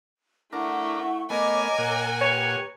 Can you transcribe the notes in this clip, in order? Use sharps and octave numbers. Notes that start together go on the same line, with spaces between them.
A3 D4 E4 A#4 F#5 C#6
A3 B3 A#4 C#5 D#5 G#5 D6
A#2 F#5
G4 B4 C#5